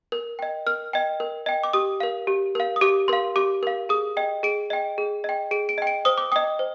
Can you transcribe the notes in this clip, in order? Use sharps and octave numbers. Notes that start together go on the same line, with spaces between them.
A#4
D#5 G5
A#4 F6
D#5 G5
A#4
D#5 G5
D6
G4 D#6
A#4 F5
G4
A#4 F5
D#6
G4 D6
A#4 F5 C6
G4 D6
A#4 F5
G#4 D#6
D#5 G5
G#4 D7
D#5 G5
G#4
D#5 G5
G#4 D7
D7
D#5 G5
D7
C5 D#6
D6
D#5 G5 D#6
C5